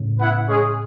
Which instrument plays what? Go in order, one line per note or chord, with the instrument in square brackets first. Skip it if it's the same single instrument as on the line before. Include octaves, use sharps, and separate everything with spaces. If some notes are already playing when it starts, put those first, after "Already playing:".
Already playing: [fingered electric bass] A2 C#3
[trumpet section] B3 E4 B4 F#5
G#3 C#4 G#4